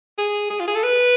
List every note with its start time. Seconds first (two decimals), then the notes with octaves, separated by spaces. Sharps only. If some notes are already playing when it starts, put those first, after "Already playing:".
0.18 G#4
0.50 G#4
0.60 F4
0.67 G#4
0.75 A4
0.83 B4